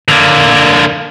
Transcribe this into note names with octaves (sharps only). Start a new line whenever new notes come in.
D3 A#3